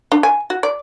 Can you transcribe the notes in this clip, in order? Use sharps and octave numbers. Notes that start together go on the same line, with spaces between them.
D4
G#5
F#4
D5